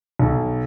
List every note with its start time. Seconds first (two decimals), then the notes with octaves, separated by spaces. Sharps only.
0.19 B1